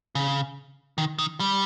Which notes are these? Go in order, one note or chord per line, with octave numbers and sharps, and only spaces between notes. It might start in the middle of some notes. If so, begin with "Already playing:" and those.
C#3
D#3
D#3
G3